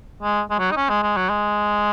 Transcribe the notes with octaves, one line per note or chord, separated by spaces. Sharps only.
G#3
G#3
F#3
D#4
C#4
G#3
G#3
F#3
G#3